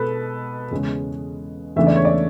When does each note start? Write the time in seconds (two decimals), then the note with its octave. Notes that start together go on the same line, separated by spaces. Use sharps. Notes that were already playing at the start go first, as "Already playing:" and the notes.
Already playing: B2 G#3 B3 A4 B4
0.71 E2 C#3 G#3 C#4
1.76 E2 C#3 E3 A3 D4 E5
1.87 D5
1.96 C#5
2.05 D5